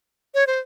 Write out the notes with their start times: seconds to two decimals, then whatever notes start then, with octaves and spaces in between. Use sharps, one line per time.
0.35 C#5
0.47 C5